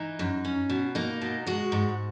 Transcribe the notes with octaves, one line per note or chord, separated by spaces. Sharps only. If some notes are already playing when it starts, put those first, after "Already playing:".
Already playing: E3 D#4
F#2
C#4
B2
A#3 D#4
B2
G#3 F#4
G#2